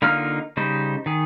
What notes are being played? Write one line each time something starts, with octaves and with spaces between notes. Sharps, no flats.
D3 A#3 D#4 F4 F6
C#3 G3 D#4 C5
D#3 G#4